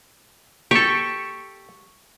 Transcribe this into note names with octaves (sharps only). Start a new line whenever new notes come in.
G4 A4 C#6